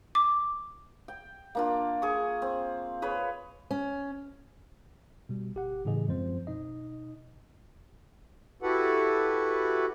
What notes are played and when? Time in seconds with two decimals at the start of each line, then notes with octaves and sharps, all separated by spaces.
0.15 D6
1.08 G5
1.55 A#3 D4 F4
2.02 G#4 C#6
2.42 C4
3.02 G#4 B4 C#5
3.71 C#4
5.29 B2 G3
5.55 G1 G4 F#5
5.85 A2 C#3 E3 G#4 D#5
6.08 F#2 F3 G#3 C4 C5
6.47 B2 D#4 D#5
8.62 E4 F#4 G4 A4 B4 F#5